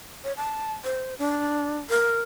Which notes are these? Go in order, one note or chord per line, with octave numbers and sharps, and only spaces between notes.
C#5
A5
C5
D4
A#4